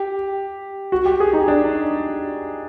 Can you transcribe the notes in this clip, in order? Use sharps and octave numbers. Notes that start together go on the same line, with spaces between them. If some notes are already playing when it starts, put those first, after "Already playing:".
Already playing: G4
F#4
G4
G#4
D#4
D4